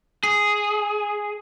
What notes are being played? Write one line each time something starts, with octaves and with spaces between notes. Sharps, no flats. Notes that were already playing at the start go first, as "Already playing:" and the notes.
G#4